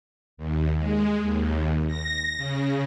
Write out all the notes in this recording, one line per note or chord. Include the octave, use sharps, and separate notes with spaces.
D#2
G#3
D#2
A#6
C#3